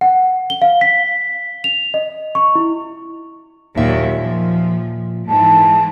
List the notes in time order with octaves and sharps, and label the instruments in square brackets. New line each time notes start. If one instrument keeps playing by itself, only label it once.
[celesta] F#5
G7
F5
B6
F7
D#5
C#6
E4
[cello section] D#2 F#3 [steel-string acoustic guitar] A#2 E5
[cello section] F3
[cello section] G#2 E3 [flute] A5